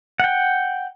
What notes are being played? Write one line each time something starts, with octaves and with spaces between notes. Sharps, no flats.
F#5 G5